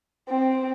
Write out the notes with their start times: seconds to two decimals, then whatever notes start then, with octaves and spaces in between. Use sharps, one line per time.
0.29 C4